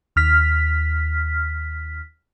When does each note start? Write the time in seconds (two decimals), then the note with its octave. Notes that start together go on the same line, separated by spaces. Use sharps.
0.16 D#2 F6 B6